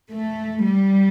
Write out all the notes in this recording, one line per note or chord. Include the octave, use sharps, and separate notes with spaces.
A3
G3